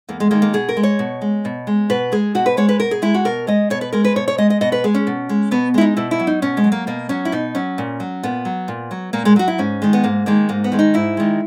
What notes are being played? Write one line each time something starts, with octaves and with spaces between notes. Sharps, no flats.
E2 A#3
G#3
D#3 G#3 A#3
A#3
B2 G#4
A#4
G#3
C#5
B2
G#3
B2
G#3
B2 B4
G#3 G#4
B2 F#4
B4
G#3 C#5
B4
B2 A#4
G#4
G#3 E4
F#4
B2 A#4
G#3 D#5
B2 C#5
B4
G#3 A#4
B4
B2 C#5
C#5
G#3 D#5
D#5
B2 D#5
B4
G#3 G#4
C#4
B2
G#3
B2 B3
G#3 E4
D#4
B2 E4
E4
F#3
D#4
B2 C#4
G#3
F#3
A#3
B2 A#3
F#3 C#4
E4
B2 D#4
F#3 C#4
A#2
F#3
A#2 B3
F#3
A#2
F#3
A#2 A#3
G#3
F#3 F#4
E4
G#2 C#4
D#3 G#3
B3
G#2 A#3
D#3 G#3 A#3
G#2 A#3
B3
D#3 G#3
D#4
G#2 E4
D#3 G#3